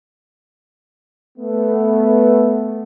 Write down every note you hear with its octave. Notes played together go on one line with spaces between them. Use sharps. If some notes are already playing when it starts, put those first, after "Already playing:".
A3 B3